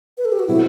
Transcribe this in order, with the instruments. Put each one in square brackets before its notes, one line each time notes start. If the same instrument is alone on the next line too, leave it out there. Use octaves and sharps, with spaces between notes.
[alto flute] B4
A4
G4
F#4
[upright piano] B2 F#3 C4 [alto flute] E4